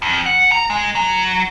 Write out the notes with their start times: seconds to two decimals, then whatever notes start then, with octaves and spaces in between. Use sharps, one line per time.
0.02 F2
0.26 F#5
0.52 A#5
0.70 G#3
0.95 F#3